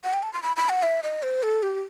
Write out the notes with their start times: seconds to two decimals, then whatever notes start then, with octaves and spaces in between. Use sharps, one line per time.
0.04 F#5
0.13 G5
0.23 A5
0.33 C6
0.43 B5
0.57 B5
0.69 F#5
0.83 E5
1.03 D#5
1.23 C5
1.43 A4
1.63 G4